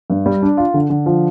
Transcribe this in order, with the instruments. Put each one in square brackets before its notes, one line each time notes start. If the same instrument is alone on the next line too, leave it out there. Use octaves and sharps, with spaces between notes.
[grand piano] G2
G3
D4
F4
D3
D3
F3